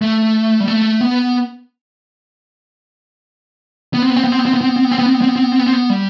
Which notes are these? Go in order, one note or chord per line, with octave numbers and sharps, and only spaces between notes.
A3
G3
A3
B3
B3
C4
B3
C4
B3
C4
B3
C4
B3
C4
B3
C4
B3
C4
B3
C4
B3
C4
B3
C4
B3
C4
B3
C4
B3
G3